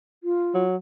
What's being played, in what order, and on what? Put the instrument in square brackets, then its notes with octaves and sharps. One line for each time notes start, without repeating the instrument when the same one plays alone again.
[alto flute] F4
[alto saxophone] F#3